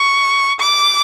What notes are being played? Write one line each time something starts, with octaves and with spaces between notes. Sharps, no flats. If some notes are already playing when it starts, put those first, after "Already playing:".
Already playing: C#6
D6